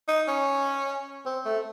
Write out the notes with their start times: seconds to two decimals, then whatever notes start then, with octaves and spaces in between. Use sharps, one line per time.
0.08 D#4
0.28 C#4
1.26 C4
1.45 A3